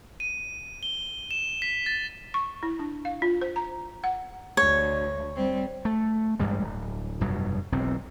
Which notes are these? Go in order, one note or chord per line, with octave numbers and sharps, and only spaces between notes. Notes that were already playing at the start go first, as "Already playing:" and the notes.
D#7
G7
E7
B6
A6
C#6
E4
D4
F5
F4
C5
A#5
F#5
D2 C#5
G3 C4
A3
A1 G2 G3 G#3
D1
F1 G2 B2 F#3
E1 B1 C4